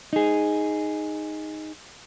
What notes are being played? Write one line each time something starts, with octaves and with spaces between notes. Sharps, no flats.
D#4 G#4